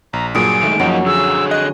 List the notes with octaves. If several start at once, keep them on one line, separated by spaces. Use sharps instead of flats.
A#1 A#5
G2 A#2 F#3 G#4 D7
D#3 G#3 A3
F#2 F3 F#3 A#3 D#4
D3 G#4 E6
D#5 F#6